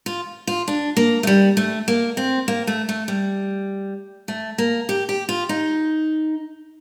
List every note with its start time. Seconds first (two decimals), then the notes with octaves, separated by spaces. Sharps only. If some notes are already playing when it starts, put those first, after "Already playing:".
0.06 F4
0.47 F4
0.68 D4
0.97 A#3
1.23 A3
1.27 G3
1.57 A3
1.88 A#3
2.17 C4
2.48 A#3
2.67 A3
2.89 A3
3.08 G3
4.28 A3
4.58 A#3
4.89 G4
5.09 G4
5.29 F4
5.49 D#4